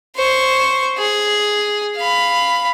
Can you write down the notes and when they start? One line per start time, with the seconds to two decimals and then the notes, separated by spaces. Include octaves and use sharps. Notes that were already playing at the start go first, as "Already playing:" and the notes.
0.16 C5 C#6
0.98 G#4
1.96 F5 B5